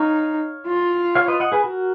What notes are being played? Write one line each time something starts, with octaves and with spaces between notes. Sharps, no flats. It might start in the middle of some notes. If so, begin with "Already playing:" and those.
Already playing: D#4 C#5 F5
F4
C#5 F5
B4 D#5
D#5 F#5
G#4 B4
F#4 A#4